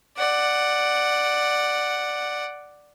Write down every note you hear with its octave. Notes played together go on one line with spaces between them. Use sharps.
D5 F#5